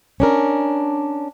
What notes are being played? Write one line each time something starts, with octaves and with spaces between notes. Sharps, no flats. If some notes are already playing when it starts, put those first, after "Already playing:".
C#4 D4 A#4